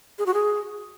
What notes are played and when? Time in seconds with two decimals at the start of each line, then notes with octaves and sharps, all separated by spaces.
0.19 G#4
0.26 F#4
0.34 G#4